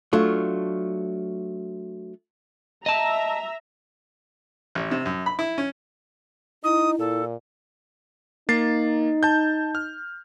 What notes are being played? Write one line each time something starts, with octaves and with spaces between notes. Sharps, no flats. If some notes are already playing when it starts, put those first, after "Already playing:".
F#3 A3 D4 F4
D#5 E5 A5 A#5
A1
C3
F#2
B5
E4
C#4
D#4 E4 D#6
A#2 A4
A#3 D#4 A6 C7
A5 G6
F6